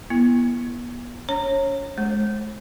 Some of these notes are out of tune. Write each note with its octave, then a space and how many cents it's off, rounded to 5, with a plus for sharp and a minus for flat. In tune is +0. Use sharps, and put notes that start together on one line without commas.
B3 -35 E4 +25
C#4 +35 C#5 -20 A#5 -25
G#3 +35 C5 +35